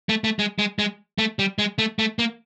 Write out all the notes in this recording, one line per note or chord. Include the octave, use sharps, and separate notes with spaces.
A3
A3
G#3
G#3
G#3
A3
G3
G#3
A3
A3
A#3